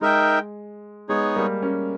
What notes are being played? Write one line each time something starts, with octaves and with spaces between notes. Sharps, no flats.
G#3 D#4 A#4 E5 G5
G#3 B3 D#4 G#4 C#5
G3 A#3
A#3 C#4